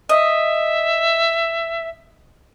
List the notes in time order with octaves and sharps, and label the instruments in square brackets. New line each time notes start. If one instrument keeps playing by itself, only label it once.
[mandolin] D#5 [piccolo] E5